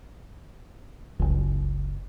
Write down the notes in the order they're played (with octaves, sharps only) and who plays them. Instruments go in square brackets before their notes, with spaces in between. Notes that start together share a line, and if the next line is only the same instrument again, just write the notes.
[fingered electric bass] F#1 C#2